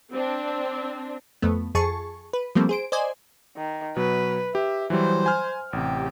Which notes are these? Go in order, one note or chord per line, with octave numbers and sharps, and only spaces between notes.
C4 D4
F2 A3 B3
F2 G#4 A5 C#6
B4
F3 G3 A3 A#3 C4
G#4 C5 D7
C5 D5 D#5 G#5
D#3
B2 F#3 B4
G4 E5
E3 F#3 G3 C5
G#5 F6
A1 C3 G4